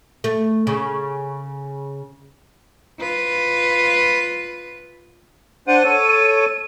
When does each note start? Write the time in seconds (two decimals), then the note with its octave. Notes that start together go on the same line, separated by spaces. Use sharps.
0.24 A3
0.67 C#3
3.00 F4 B4
5.68 D4 C5 F#5 D#7
5.84 A4 C#5